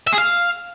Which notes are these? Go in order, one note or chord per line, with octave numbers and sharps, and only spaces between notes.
E5
G#4
F5